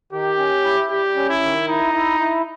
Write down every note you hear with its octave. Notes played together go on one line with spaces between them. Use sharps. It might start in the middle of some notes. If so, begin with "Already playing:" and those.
D#3 G4
C#4
E4
G3 G4
C#4
E4
D#3
D#4 E4
E4
E4